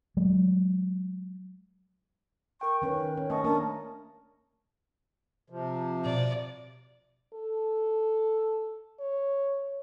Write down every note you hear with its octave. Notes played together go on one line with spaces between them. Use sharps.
F#3 G#3 A3
A#4 G5 C#6
D#3 C#4 B4
C#4
A3 C#4 D#5 A5 C#6
A#3 D4 A#4 A5
C3 F3
B2 D5
A4
C#5